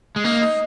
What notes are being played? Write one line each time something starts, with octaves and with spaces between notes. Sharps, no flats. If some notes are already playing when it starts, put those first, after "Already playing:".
G#3
A#3 D#4
D#4